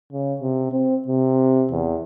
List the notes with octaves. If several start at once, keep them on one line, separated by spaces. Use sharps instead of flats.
C#3
C3
C4
C3
E2